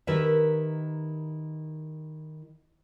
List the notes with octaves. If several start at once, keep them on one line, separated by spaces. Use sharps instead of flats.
D#3 E4 G4 A#4 B4 E5